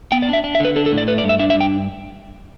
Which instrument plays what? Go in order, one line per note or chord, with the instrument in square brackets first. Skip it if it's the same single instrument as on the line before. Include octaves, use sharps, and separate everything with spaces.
[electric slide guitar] B3 G5
D5
D4 E5
D4
E5
D3 B4
D4 A4
A4
A2
D5
A3 B4
D5
G2
E5
D4 E5
E5
G2
G5